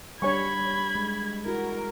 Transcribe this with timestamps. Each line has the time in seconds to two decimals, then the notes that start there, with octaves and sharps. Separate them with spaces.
0.22 G3 D4 C#5 G#5 B5 C#6 G#6
0.95 G#3
1.46 E4 F#4 A#4